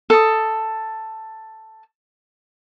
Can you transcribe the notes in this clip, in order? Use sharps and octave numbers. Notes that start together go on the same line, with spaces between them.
A4 D#6